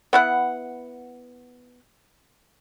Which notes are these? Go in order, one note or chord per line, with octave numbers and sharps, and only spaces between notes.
B3 E4 F#5